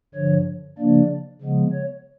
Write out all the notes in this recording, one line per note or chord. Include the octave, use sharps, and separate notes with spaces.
G2 D3 F3 C#5
C#3 F3 A#3 D4 D5
C#3 F3 G#3 B3
C#5